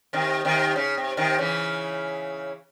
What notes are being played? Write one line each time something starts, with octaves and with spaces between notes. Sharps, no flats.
C3 D#3
C3 D#3
C#3
C3
C3 D#3
C#3 E3